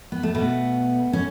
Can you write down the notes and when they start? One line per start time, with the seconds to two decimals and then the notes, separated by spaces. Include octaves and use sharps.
0.12 B3
0.23 A3
0.34 B2 A3 B3
1.13 C#4